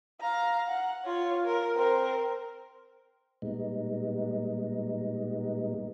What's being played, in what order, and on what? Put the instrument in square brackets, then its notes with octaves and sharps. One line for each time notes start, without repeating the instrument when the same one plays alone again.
[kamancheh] F5 A#5
F#5
F4 C#5
A#4
C4 A#4
[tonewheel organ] A#2 G3 G#3 B3 D#4